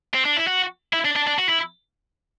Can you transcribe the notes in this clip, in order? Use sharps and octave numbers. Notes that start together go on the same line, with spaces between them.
C4
D4
E4
F#4
E4
D4
D4
D4
F#4
E4